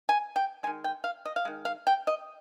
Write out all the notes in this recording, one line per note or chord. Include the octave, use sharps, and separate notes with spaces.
G#5
G5
D#3 G#3 G#5
G5
F5
D#5
F5
D#3 G#3
F5
G5
D#5